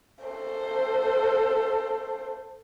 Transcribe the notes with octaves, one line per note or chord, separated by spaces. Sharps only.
A4 C5